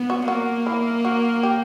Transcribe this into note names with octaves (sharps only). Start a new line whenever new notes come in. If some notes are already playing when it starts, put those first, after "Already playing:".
Already playing: B3
F#4
A#3 F#4
E4
F#4
G4